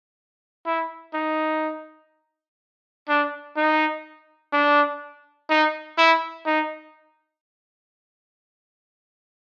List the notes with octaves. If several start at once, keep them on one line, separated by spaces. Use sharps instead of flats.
E4
D#4
D4
D#4
D4
D#4
E4
D#4